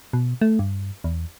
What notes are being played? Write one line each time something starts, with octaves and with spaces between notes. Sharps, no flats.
B2
A3
G2
E2